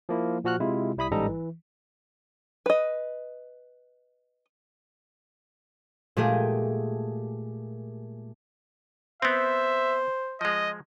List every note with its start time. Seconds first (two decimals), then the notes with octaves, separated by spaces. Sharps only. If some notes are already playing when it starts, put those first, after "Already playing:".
0.09 F3 A#3 E4
0.44 A#2 F3 F#4 F6 F#6
0.60 C3 G#3 E4 F4
0.97 C2 G3 E4 B5 D#6 B6
1.11 A1 G#2 G3 A4 D#5 A#5
1.28 E3
2.66 B4 D#5
6.17 A#2 G#3 A3 G4 G#4
9.22 B3 C4 C5 E5
10.41 F3 G#3 D#5